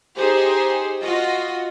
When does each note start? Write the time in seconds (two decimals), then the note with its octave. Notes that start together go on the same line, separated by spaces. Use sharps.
0.16 D#4 G4 G#4 C5
1.03 F4 F#4 D#5